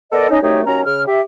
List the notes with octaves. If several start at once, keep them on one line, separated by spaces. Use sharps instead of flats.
B3 A4 A#4 D5 D#5
C#4 D#4 D#5
C2 F#2 A3 D#4 G4 C#5
D#2 F#3 C#4 A#5
C#3 F6
G4 E5